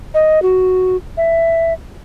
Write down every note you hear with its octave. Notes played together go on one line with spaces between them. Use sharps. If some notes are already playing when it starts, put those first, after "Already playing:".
D#5
F#4
E5